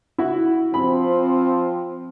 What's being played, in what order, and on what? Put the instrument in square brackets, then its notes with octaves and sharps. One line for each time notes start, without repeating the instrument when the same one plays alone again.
[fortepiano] E4 F#4
[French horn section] F3 C4 [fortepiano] B5